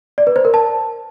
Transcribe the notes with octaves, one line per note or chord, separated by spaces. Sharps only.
D5
B4
C5
A#4
A5